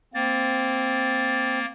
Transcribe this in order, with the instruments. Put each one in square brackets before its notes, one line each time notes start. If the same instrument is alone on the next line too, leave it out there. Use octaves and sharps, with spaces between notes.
[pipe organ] A#3 A6 [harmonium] C4